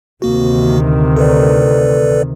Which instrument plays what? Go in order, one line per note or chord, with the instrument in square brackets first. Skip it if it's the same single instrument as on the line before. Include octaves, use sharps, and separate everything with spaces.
[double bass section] D2 C3 D#3 [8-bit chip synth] A#3 F#4
[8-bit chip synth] A4 B4 D5